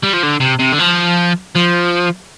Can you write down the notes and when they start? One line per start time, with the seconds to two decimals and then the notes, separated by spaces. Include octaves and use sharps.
0.03 G3
0.13 F3
0.23 D3
0.41 C3
0.60 C3
0.73 D3
0.79 F3
1.55 F3